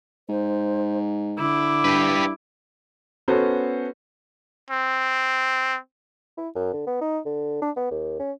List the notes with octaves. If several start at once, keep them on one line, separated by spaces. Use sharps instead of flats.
G#2 C5
D3 E4 D6
G2 G4 B4
B3 C#4 F#4 A4 C5
C4
E4
F#2
D3
B3
D#4
D3
D4
B3
D#2
C#4